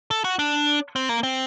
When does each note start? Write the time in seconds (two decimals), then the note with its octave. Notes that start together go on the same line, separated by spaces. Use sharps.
0.11 A4
0.24 F#4
0.39 D4
0.96 C4
1.09 A#3
1.23 C4